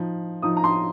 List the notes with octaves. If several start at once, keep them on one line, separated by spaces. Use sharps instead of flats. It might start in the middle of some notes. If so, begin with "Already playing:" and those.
Already playing: F3 D#4
F3 D#4 D#6
A#5
C6